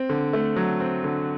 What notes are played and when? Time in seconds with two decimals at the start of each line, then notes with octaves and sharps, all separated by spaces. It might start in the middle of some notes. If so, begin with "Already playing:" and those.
Already playing: C4
0.09 D3
0.33 A3
0.56 F#3
0.80 C4
1.04 D3